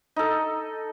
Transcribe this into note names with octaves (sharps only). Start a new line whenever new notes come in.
D#4 A4